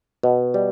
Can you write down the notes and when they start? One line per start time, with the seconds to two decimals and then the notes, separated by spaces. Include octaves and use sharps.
0.23 B2
0.54 G3